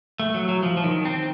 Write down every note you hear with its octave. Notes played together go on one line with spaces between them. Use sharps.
A3
F#3
F#3
F3
F3
D#3
C4